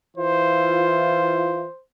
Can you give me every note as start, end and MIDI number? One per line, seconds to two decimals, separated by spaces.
0.17 1.65 52
0.17 1.65 64
0.17 1.65 65
0.17 1.82 72